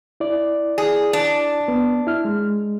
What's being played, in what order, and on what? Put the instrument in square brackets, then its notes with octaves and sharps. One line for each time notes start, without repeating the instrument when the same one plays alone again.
[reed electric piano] E4 D5
[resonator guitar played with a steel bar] G#4
D4
[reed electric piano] B3
E4 F6
G#3